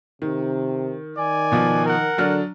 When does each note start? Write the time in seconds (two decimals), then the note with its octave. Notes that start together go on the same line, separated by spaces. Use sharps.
0.22 C3 D#3
1.17 D#3 D5 G#5
1.52 B2 F3
1.86 A#4 F#5
2.18 D3 F#3 D4 F6